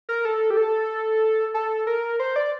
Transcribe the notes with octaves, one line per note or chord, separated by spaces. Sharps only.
A#4
A4
G4
A4
A4
A#4
C5
D5